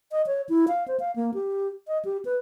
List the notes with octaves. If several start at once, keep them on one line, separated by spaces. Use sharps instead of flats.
D#5
C#5
E4
F5
C5
F5
A#3
G4
D#5
G4
B4